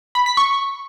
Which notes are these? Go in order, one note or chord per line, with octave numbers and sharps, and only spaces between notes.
B5
B6
C#6